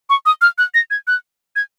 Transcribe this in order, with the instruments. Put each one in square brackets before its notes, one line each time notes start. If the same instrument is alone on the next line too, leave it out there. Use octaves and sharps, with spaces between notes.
[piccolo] C#6
D#6
F6
F#6
A#6
G#6
F#6
G#6